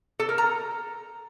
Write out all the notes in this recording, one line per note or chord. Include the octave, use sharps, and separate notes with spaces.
A4
A#4
A#5